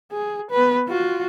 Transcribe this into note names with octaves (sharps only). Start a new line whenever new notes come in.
G#4
B3 B4
F4 F#4